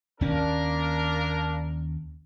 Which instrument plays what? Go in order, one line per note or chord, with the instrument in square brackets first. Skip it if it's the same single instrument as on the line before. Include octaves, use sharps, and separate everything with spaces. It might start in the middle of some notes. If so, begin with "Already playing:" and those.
[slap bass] D#2 C#4 [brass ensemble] A#3 D4 A#4